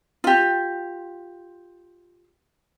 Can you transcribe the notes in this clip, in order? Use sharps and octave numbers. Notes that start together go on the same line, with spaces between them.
F4 G4